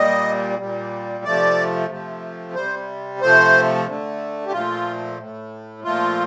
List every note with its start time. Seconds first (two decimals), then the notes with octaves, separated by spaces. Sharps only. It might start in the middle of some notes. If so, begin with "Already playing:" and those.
Already playing: A#2 G3 D#5
0.59 A#2 G3
1.25 C3 F3 A3 D5
1.90 C3 F3 A3
2.55 C3 G3 C5
3.21 C3 F3 A3 C5
3.87 D3 A3
4.46 G4
4.53 A#2 F3 A3 F4
5.18 A2 A3
5.84 A#2 F3 A3 F4